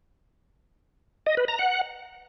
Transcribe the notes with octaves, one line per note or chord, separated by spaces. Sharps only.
D#5
B4
A#5
F#5